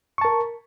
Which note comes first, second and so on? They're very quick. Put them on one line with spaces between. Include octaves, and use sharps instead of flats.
C#6 A5 A#4